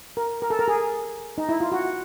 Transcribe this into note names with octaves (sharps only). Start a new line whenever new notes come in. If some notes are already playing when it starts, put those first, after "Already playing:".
A#4
A#4
A4
A#4
G#4
D#4
E4
F4
F#4